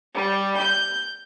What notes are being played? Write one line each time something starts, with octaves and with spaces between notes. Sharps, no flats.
G3
G6